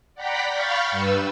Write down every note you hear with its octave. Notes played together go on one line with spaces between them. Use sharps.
D5 F#5 G5 A#5 B5 B6
F5 B5 C#6 F6 G6 A6
G2 B4 E6